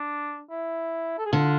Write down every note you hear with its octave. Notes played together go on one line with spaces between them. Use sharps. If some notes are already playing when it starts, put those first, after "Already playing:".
Already playing: D4
E4
A4
G#4
D3 F4